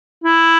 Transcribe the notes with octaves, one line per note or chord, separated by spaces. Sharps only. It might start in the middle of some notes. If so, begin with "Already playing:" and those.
E4